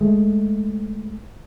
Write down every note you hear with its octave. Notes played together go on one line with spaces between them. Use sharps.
G#3 A3